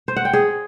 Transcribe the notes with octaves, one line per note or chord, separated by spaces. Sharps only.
C5
F#5
G5
G#4